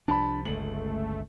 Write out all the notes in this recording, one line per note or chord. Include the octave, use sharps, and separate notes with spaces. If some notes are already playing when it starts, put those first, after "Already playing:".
C2 F3 D4 A5 B5
G1 C#2 D3 A3 F#7